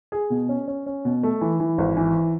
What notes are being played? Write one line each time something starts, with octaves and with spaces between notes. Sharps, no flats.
G#4
B2
C#4
C#4
C#4
B2
A3
E3
E3
G#1
E3